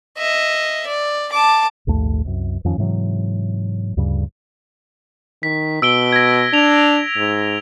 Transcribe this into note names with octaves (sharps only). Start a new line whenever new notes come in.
D#5 E5
D5
A5 D6
A#1 D#2 G#2 A3
C2 F#2
F2 D#3 F3 C#4
G#2 C3 E3 F#3
D2 G2 C#3 G3
D#3 B6
B2 E6 D7 G7
G#6 A#6
D4 F7
G#2